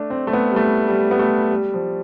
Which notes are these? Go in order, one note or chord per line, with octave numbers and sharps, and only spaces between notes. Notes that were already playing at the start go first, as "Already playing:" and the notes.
Already playing: A3 D4
C4
A3
B3
G3
A3
G3
B3
A3
G3
F3